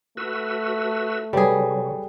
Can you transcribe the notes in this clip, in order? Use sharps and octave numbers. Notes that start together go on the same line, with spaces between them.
A3 F#4 B4 E6
C3 F#3 G3 G#4 A4 B4 C#5